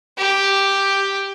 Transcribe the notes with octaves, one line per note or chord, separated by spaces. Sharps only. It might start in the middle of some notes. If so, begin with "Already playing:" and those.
G4